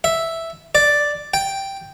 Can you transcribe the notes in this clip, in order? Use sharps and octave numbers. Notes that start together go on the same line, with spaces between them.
E5
D5
G5